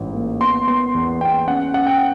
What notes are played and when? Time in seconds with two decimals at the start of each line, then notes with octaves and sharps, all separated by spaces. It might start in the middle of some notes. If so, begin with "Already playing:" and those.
Already playing: A1 G#2
0.14 A#3
0.41 B3 C6
0.67 B3 C6
0.95 E2
1.21 B3 G5
1.47 C#4 F#5
1.74 C#4 F#5
1.87 G5